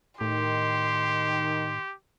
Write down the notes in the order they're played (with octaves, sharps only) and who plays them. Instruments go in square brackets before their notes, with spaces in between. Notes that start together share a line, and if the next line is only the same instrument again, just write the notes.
[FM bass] A2 [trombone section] D#3 [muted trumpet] G4 [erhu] C6